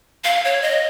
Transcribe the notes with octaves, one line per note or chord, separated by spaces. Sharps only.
F5
C#5
D#5